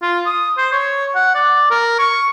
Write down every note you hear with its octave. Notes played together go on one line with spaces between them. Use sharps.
F4
D#6
C5
C#5
F#5
D5
A#4
C#6